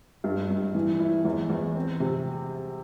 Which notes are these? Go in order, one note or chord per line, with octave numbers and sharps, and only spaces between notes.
G2
G2
E3
E4
E2
E2
C4
C3